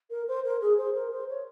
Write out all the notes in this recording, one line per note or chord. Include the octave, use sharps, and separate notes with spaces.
A#4
C5
A#4
G#4
C5
A#4
C5
C#5